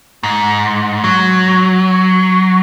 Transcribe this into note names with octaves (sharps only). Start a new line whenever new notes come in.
G#2
F#3